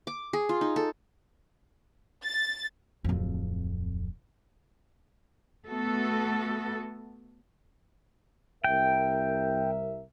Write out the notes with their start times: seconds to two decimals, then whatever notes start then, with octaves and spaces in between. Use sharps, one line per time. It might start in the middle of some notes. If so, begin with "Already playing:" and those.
0.07 D6
0.33 G#4
0.49 F4
0.61 D#4
0.76 A4
2.24 A6
3.04 D1 F2
5.67 A3 B3 F#4 A4
8.64 C2 A#4 E5 G5